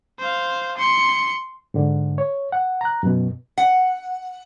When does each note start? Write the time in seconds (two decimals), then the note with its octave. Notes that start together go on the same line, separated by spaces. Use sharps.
0.19 C5 F5
0.77 C6 C#7
1.74 G#2 D3
2.18 C#5
2.52 F#5
2.81 A#5 F#6
3.03 F#2 B2
3.58 F#5